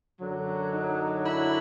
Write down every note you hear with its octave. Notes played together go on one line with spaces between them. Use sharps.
F#2 D3 F#3
D#4
E4